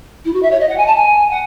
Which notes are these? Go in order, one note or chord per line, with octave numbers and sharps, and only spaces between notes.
E4
F#4
E5
C#5
D#5
F#5
G#5
A5
G#5
F#5